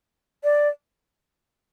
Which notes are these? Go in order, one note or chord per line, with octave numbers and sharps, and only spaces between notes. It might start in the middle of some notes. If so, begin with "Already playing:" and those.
D5